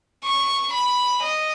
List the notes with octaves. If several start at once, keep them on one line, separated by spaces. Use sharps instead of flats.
C#6
B5
D#5